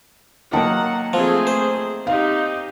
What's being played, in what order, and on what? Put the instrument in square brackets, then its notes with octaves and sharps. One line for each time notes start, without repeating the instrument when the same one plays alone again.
[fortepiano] D#3 F#3 A#3 [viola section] F#5 [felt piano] A5
[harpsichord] F3 [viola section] A3 C4 G#4
[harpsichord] C5
[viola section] C4 D#4 G4 [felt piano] F5